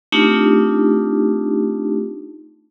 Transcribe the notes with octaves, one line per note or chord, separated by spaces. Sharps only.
A3 C4 D4 D#4 F4 G4